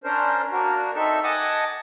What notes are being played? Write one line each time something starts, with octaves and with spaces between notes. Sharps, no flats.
C#4 D4 A#4 C5
A#3 D4 F#4 A#4
C4 D#4 A4 E5
D#5 F#5 G#5 A5 D6 D#6